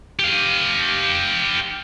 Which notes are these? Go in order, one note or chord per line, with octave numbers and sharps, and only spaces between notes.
G4 F5